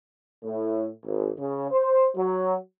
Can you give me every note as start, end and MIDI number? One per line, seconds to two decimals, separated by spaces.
0.43 0.88 45
1.06 1.30 32
1.38 1.70 49
1.72 2.08 72
2.15 2.54 54